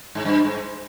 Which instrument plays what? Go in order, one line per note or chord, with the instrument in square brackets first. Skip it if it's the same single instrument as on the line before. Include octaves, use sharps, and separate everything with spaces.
[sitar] G#2
G2
G#2